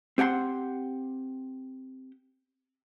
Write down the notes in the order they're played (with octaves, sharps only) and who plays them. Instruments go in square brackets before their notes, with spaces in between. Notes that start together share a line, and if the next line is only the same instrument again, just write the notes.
[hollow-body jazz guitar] C4 G4 F#5 G#5 C6